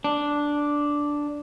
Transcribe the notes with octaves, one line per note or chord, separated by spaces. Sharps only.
D4